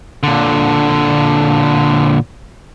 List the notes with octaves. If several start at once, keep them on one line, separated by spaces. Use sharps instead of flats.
A#2 D3